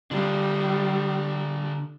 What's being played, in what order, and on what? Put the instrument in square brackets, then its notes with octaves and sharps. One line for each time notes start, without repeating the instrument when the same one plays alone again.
[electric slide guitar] D3 [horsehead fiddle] G3 [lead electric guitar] D4 F4